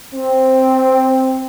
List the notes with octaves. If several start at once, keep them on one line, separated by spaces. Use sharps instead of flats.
C4